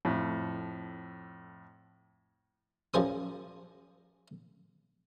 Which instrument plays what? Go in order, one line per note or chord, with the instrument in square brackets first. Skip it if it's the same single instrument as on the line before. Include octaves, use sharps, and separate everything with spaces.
[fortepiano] F2 A2
[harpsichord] F#2 F3 G#4 C5 D#6